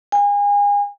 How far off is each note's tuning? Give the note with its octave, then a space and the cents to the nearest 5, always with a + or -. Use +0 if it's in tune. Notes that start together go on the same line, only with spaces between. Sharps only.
G#5 -35